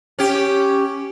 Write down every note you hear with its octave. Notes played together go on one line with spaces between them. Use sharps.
C#4 G4